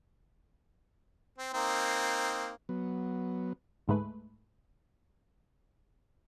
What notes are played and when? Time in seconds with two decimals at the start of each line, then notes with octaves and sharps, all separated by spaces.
1.38 C4
1.53 A#3 C4 D#4
2.69 F#3 B3
3.88 D2 G#2 G#3 A3 B4